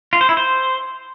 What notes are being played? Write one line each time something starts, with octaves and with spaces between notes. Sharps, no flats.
F4
C5
E4
C5